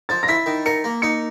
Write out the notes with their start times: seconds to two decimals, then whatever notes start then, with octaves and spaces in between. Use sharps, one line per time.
0.09 F3 A6
0.23 A#6
0.28 E4 B6
0.46 D#3
0.66 A#4 C#7
0.84 A#3
1.02 D#4 C#7